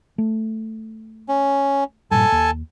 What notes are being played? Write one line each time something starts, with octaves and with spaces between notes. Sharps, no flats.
A3
C#4
G2 A#2 A4 G#5 A5
D#2